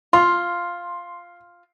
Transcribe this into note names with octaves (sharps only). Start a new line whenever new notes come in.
F4 C6